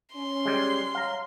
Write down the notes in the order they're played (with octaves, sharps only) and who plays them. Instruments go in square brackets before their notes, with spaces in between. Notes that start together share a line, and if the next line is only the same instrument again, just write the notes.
[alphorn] C#4 [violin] C6
[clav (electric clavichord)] G3 G#3
[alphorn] C#5 [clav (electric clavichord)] F5 A#5